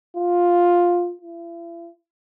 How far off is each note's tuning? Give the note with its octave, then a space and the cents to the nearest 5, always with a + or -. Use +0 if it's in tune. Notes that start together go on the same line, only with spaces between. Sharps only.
F4 +5
E4 +45